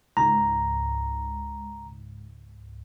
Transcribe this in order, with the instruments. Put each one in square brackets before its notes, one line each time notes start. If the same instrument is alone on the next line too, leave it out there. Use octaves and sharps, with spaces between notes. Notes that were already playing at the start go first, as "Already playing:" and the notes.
[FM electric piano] C#2 G#2 [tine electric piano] A#5